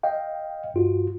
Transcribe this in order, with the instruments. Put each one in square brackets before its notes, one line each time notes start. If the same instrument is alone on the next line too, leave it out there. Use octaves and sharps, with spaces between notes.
[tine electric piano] D#5 F5 G5
G2 F4 F#4